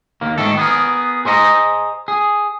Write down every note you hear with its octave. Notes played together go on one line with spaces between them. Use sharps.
D#2 A#3
G#2 D#3 A3 A4
B3 G#4 A#4
G#4 C5 D#5 F5 A#5
G#4